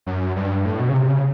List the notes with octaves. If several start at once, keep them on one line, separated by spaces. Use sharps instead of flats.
F#2
G2
A2
B2
C#3
C3
C#3